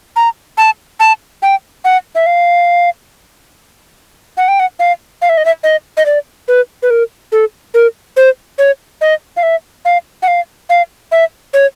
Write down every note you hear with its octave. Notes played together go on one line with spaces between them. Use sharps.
A#5
A5
A5
G5
F#5
E5
F5
F#5
G5
F#5
F5
F5
E5
D#5
E5
D#5
D#5
D5
B4
B4
A#4
A4
A#4
C5
C#5
D#5
F5
E5
F5
F#5
F5
F5
E5
C#5